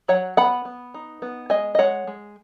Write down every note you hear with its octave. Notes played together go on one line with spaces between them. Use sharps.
F#3 C#5 F#5
B3 F#5 B5
B3
D#4
B3
G#3 D#5 G#5
D#5
G#3 C#5 F#5
G#3